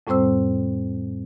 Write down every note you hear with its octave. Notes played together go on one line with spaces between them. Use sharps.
F2 A2 G3 C4 C5 E6